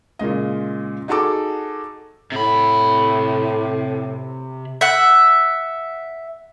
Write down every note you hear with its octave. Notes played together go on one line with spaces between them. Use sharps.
A#2 C#3 G#3 D#5
D#4 F#4 G#4 A4 D6
A2 C3 B5
E5 F#5